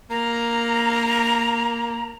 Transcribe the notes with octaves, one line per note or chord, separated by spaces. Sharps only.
A#3 A#5